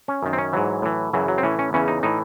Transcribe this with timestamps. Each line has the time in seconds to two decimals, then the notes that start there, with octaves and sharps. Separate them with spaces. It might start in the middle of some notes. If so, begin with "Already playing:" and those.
0.08 C#4
0.23 F#2 D#3
0.33 C4
0.38 C#4
0.53 G#2 E3 F#3
0.82 A2 E3
1.13 F#2 C#3 E3 F#3
1.28 F#3
1.38 C4
1.43 A2 E3 C#4
1.59 C#4
1.73 E2 C#3 E3 C#4
1.88 D#4
2.03 A2 E3 D#4